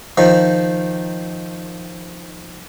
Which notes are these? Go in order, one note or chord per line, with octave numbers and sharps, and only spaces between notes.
D#3 F3